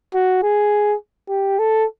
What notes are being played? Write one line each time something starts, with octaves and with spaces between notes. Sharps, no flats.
F#4
G#4
G4
A4